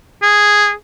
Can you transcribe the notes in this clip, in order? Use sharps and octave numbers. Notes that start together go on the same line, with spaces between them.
G#4